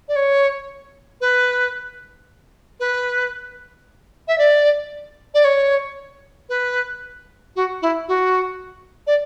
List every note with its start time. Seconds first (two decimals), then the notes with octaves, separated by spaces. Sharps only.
0.08 D5
0.16 C#5
1.21 B4
2.80 B4
4.28 E5
4.38 D5
5.34 D5
5.44 C#5
6.49 B4
7.56 F#4
7.82 E4
8.08 F#4
9.07 D5